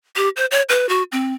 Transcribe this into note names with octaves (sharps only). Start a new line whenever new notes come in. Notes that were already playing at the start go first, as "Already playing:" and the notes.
G4
C5
C#5
B4
F#4
C4